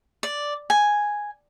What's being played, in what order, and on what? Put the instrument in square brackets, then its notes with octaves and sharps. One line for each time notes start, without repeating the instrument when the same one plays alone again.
[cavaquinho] D5
G#5